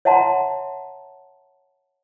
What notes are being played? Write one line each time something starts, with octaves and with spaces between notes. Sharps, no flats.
C#5 E5 F#5 A5 A#5 C6